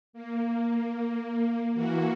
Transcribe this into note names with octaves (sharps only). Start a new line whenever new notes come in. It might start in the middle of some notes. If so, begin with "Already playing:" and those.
A#3
E3 A#3 F#4